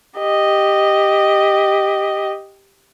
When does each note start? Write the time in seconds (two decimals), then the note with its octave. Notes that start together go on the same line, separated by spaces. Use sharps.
0.19 G4 D#5